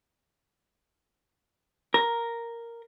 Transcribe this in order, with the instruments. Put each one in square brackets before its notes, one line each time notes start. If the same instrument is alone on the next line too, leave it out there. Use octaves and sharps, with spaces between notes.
[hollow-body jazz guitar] A#4